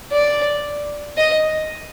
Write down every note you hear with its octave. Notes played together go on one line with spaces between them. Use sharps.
D5
D#5